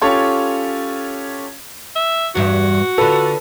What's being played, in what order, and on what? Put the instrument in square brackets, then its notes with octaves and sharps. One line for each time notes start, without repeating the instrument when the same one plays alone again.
[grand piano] C#4 F4 G4 A4 C#5
[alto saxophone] E5
[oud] E2 G2 E5 [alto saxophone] F#4
[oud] D3 F4 [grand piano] A4 B4